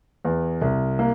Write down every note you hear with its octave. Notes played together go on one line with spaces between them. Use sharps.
E2
C2
A#3